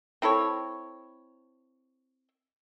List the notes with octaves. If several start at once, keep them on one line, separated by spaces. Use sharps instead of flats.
C4 E4 A4 C#5